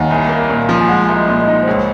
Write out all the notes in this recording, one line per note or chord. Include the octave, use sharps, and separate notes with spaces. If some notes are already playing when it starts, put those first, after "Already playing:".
Already playing: D#2 C#5 D#5 F5 F#5 G#5
C2 G#5
A#3
A#2
F3
G#5
G#3 F#5
C2
D#5
A#2
D#5
D#4
C5
C#2 C#5